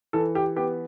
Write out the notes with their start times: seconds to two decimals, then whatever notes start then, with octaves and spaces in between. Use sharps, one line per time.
0.13 E3 A4
0.35 G4
0.56 B3 G4